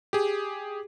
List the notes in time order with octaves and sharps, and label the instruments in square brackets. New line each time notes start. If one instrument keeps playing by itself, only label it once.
[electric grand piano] G4 G#4